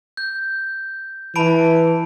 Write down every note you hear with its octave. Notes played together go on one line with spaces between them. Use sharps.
G6
E3 A5 B5 D7